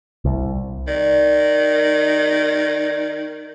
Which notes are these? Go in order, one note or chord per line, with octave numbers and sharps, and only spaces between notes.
C2
D#3 D5